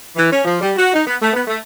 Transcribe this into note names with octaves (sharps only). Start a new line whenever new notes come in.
E3
C#4
F3
G3
F#4
D#4
B3
A3
B3
A3